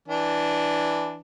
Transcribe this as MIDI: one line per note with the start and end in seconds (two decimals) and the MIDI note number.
0.08 1.20 52
0.08 1.20 62